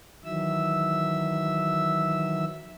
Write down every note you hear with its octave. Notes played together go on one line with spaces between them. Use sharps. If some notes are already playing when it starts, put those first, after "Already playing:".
D#3 E3 F#3 E5 E6